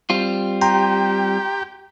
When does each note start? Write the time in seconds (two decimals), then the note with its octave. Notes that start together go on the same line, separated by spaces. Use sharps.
0.10 G3 C4 F4
0.61 G4 G5 A#5 C6